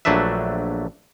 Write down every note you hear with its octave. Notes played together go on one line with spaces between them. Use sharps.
A#1 F#3 A3 D4 B4 E5